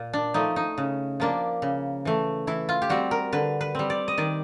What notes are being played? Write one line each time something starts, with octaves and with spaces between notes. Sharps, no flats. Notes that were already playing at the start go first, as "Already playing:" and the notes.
Already playing: A#2
D4
F3 A3 D#4
D#4
C#3
F3 A#3 D4
C#3
E3 A3
E3 E4
F4
G4
G3 C4 F#4
A#4
D3 B4
B4
G3 C4
D5
D#5
D#3 D5